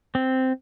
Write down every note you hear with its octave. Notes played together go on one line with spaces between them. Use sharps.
C4